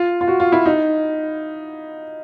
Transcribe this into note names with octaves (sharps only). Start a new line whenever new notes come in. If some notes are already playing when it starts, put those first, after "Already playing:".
Already playing: F4
F4
F#4
F4
E4
D#4